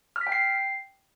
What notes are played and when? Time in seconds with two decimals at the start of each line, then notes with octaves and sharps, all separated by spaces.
0.16 F6
0.21 B6
0.27 G5
0.32 C7